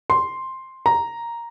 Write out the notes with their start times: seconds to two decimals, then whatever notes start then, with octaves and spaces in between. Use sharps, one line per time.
0.10 C6
0.86 A#5